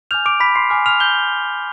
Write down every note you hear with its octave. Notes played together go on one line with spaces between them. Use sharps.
G#5 D6 F6 G6 F7
D6 D7
B5 B6
C6 C7
G#5 D6 F6
F6 F7
G6 G7